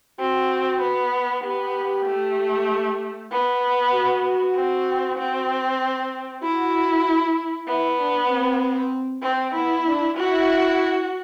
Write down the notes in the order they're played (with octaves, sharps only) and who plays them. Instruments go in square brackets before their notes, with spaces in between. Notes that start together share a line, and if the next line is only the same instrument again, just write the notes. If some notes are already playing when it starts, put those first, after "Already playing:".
[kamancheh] C4 [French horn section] F#4
[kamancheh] B3
[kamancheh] B3 [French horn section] G4
[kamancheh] A3
B3
[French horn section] F#4
[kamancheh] C4
C4
[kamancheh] E4 [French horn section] F#4
[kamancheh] B3 [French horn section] E4
[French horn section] D4
C4
[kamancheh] C4
[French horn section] B3 [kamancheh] E4
[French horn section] D4
[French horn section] E4 [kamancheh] F#4